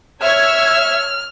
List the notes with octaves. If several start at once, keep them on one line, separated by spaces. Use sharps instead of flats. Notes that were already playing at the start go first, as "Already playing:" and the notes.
C#5 E5 E6 F6 G#6